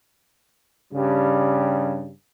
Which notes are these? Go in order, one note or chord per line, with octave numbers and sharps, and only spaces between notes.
G2 C#3 G3